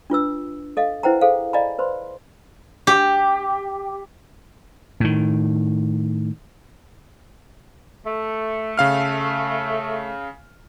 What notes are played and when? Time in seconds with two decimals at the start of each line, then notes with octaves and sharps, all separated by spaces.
0.10 D4 F4 B4 E6
0.77 A4 D#5 F5
1.03 E4 B4 C5 F#5 G5 A#5
1.21 G#4 A4 C5 F5
1.53 D5 D#5 F5 G#5 A#5 B5
1.78 B4 C5 B5 C6
2.87 G4
5.00 A2 D#3
8.05 A3
8.78 C#3 F5 F6